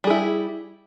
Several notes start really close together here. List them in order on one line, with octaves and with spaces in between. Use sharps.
G3 G#4 E4